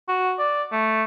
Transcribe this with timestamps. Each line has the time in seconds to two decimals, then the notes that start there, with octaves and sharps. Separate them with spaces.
0.09 F#4
0.39 D5
0.72 A3